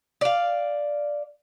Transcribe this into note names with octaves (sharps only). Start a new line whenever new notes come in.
D5 F5